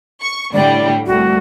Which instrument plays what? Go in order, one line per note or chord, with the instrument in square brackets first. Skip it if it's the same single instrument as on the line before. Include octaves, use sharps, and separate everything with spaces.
[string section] C#6
[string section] A2 D3 G3 [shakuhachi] D5
[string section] C2 A3 [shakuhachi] F#4